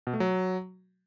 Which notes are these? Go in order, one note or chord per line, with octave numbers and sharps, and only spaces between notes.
B2
A3
F#3